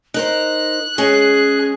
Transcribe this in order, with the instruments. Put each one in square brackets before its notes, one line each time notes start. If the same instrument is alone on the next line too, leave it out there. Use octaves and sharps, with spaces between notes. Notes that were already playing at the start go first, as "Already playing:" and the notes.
[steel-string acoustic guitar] D#4 A#4 C5 [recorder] F#6
[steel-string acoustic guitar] G#3 C#4 [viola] G#4